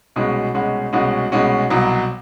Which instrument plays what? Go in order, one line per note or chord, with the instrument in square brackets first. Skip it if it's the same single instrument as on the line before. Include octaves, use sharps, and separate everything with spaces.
[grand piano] C2 B2 G#3 C#4 F#4
C2 B2 G#3 C#4 F#4
C2 B2 G#3 C#4 F#4
C2 B2 G#3 C#4 F#4
C2 B2 F#3